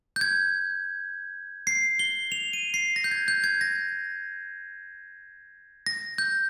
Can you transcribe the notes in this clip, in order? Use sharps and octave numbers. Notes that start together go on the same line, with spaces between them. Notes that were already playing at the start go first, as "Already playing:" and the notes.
G6
G#6
C7
G7
F7
D#7
C7
A#6
G6
G#6
G6
G#6
A#6
A#6
G6